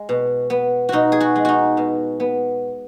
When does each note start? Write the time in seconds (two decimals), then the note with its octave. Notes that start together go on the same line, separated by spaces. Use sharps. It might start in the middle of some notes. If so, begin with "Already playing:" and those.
Already playing: G#3
0.09 B2
0.50 B3
0.89 B2 D#4 F#4
1.12 G#4
1.21 F#4
1.36 G#3
1.45 D#4 F#4
1.77 B2
2.20 B3